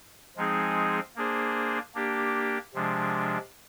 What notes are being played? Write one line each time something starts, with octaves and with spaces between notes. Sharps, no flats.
F3 G#3 C4 D#4 G#4
A#3 D4 G#4 C5
A#3 D4 G4
C3 F3 G#3 D4